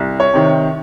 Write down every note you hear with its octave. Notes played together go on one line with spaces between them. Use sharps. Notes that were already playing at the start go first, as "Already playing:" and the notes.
Already playing: C2
C#5
C3 D#3